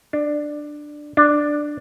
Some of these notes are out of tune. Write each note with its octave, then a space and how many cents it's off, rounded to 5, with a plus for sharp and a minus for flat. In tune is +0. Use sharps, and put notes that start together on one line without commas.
D4 +10
D4 +5